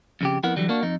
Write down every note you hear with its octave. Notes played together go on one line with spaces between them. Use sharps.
F2 C#3 G4
F2 B3 E4 A#4 F#5
D3 E3 F#3 G3
A#3 D4 F#4
F2 D#4